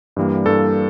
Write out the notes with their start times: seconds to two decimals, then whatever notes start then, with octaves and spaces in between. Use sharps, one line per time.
0.16 G2 E3 G3 A#3
0.46 G2 E3 G3 A#3 A4